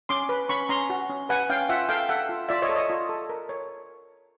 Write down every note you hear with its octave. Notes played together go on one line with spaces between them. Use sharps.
C#4 C6 D6
B4
C#4 B5 C#6
C#4 A#5 C6
F#4
C#4
B4 F#5 G#5
C#4 F5 G5
F4 E5 F#5
A4 F5 G5
A4 E5 F#5
F4
F4 D5 E5
C#5 D#5
A4
C#5 D#5
F4
A4
A#4
C#5